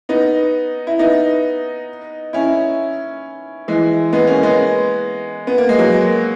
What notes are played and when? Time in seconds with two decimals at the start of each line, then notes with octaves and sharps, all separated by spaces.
0.09 B3 D#4
0.87 E4
0.99 B3 D#4
2.33 C#4 E4
3.68 E3 G#3
4.13 G#3 B3
4.27 A#3 C#4
4.43 G#3 B3
5.47 B3
5.58 A#3
5.69 G#3
5.79 F#3 A#3